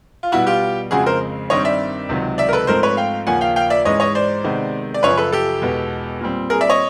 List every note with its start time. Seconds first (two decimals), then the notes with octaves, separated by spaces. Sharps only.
0.23 F4
0.32 B2 G3 B3 E4 F#4
0.47 F4 G4
0.91 F2 C#3 F3 G#3 C4 F#4 G#4
1.06 A#4 C5
1.50 G2 D#3 G3 C4 C#5 D#5
1.65 D5 E5
2.09 C#2 C3 D#3 F#3
2.38 D5 E5
2.49 A#4
2.53 A4 B4
2.67 G#2 F3 A3 C4 A#4 C5
2.83 B4 C#5
2.97 F5 G5
3.26 D#2 C#3 F3 A#3 C#4 F#5 G#5
3.41 F5 G5
3.56 F5 G5
3.70 D5 E5
3.85 G#2 E3 G#3 C#4 C#5 D#5
4.00 C#5 D#5
4.15 C5 D5
4.44 C3 D#3 G#3 B3
4.94 D5
5.03 F#2 C#3 F3 B4 C#5
5.17 A4 B4
5.32 G4 A4
5.62 E2 B2 G#3 B3
6.21 A#2 G3 C4
6.50 G#4 A#4
6.61 D5 E5
6.70 C#5 D#5